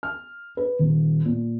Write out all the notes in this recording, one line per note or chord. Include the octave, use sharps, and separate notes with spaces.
F6
B4
D#1
A#2